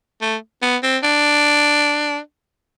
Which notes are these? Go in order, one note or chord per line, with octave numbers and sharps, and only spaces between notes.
A3
B3
C4
D4